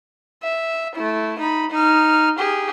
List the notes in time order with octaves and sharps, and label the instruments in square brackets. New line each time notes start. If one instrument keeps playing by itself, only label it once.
[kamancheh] E5
A3 E4
D#4 B5
D#4 F6
G4 G#4